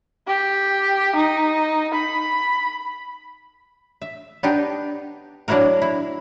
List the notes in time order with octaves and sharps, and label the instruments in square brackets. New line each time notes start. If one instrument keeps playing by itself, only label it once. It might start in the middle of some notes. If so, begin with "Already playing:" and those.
[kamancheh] G4
D#4
B5
[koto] E5
B3 D4 D#4 G4
F#3 D4 E4 F#4 A#4
E4